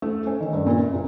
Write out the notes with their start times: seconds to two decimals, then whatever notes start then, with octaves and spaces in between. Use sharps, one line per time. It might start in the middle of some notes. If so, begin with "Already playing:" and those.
0.02 A3
0.27 C#4
0.40 D#3
0.53 G2
0.67 A#2
0.79 F#2
0.94 F#1